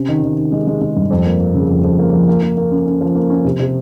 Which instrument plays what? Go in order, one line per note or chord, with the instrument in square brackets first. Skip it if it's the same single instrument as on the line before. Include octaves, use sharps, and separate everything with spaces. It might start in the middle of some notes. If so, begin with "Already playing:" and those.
Already playing: [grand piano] C3 C#4
D#3
D#3
D#3
G#3
G#3
G#3
G2
F2
A#3
A#3
C#3
F2
F2
A#3
F3
A#3
A#3
A#3
C#4
C#4
F3
A#3
C#4
C3
C3